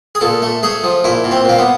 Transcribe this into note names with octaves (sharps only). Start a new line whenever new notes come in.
G#4
A#2 A4
A3
A3 G#4
F3
A#2 E4
A#2
C4
A#2 A#3
B3